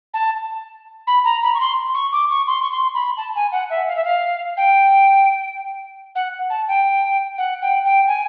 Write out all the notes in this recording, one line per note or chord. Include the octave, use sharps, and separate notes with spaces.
A5
B5
A#5
B5
C#6
C6
C#6
D6
C#6
C6
C#6
C6
B5
A5
G#5
F#5
E5
F5
E5
F5
G5
F#5
A5
G5
F#5
G5
G5
G#5